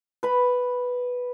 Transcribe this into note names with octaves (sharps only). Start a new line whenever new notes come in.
B4 B5